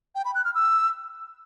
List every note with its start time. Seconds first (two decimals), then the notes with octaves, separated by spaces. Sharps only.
0.15 G5
0.25 B5
0.35 F#6
0.45 F6
0.55 E6